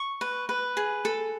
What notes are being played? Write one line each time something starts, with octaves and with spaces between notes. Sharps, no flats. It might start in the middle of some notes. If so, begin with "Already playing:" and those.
Already playing: C#6
B4
B4
G#4
A4